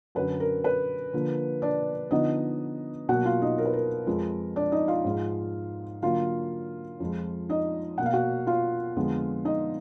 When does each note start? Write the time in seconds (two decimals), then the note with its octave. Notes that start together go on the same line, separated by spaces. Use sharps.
0.15 F#2 D3 F#3 B4
0.40 A#4
0.64 B4
1.13 D3 F3 A#3
1.62 D4 D5
2.11 D3 F3 B3 D#4 D#5
3.09 B2 F#3 A#3 F#4 F#5
3.25 F4 F5
3.42 D#4 D#5
3.58 A#4
3.65 B4
3.73 A#4
4.07 F2 F3 G#3
4.56 D4 D5
4.72 D#4 D#5
4.88 F4 F5
5.05 G#2 F3 G#3
6.02 D3 F#3 A#3 F4 F5
7.00 F2 F3 G#3
7.49 D#4 D#5
7.98 B2 A#3 F#5
8.06 F5
8.13 F#4 F#5
8.47 F4 F5
8.96 F2 D3 G#3 B3
9.45 D#4 D#5